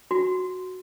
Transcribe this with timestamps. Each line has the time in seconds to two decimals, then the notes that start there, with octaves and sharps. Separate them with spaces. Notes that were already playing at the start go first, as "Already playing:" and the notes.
0.11 F#4